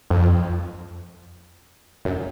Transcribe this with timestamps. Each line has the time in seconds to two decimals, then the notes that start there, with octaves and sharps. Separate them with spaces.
0.10 F2
2.05 F#2